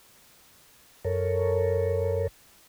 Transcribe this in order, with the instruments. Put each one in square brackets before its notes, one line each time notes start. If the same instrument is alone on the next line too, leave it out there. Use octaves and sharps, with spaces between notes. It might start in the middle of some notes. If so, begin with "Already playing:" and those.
[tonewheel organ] F#2 A4 A#4 C#5